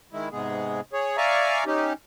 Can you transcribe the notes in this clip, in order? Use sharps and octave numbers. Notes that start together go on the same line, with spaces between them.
D#3 G#3 E4
G#2 C3 G#3 B3 G#4
G#4 C#5
D5 E5 F5 G#5 A#5 C#6
C#4 D#4 G4